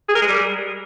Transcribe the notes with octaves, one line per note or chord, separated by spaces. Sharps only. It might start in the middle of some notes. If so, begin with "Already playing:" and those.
G#4
A#4
G#3
G3